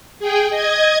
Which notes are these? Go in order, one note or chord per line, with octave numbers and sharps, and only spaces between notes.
G#4 G5
D#5 G#6